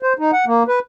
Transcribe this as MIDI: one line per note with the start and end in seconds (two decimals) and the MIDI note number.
0.03 0.13 72
0.19 0.31 63
0.32 0.45 78
0.47 0.63 58
0.68 0.79 71